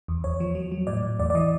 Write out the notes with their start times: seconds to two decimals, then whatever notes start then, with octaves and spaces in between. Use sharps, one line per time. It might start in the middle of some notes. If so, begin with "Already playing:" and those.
0.08 E2
0.24 E2 C#5
0.40 F3
0.55 F#3
0.72 F#3
0.87 A2 D5
1.03 A2
1.19 E2 D5
1.30 D5
1.35 E3 D#5